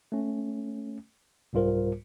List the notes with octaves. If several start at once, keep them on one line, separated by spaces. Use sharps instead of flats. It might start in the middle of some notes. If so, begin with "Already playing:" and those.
A3 C#4
C2 G#2 G3 F4 A#4 C5